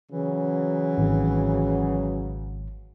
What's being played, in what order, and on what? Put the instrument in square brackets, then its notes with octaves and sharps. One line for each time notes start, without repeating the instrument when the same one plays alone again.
[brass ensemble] C#3 F#3 [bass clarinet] E3
[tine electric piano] G#1